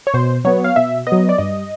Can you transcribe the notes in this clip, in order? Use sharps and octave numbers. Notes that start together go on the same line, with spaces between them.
C#5
B2 C5
F#3 B3 C#5
F5
B2 E5
B3 D#5
F#3
D5
G2 D#5